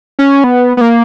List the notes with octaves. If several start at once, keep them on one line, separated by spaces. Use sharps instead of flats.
C#4
B3
B3
A#3